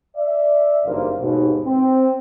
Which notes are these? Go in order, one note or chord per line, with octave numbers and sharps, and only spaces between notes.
D5 E5
F#1 G2 D#3 A#3 C5 F5
D#2 G#2 B2
C4